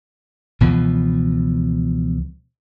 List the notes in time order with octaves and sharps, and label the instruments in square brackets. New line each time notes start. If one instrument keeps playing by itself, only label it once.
[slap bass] C#2 B2 E3 F3